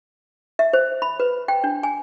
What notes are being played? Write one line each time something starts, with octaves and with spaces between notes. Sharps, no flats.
E5
C5
B5
B4
G5
D4
G#5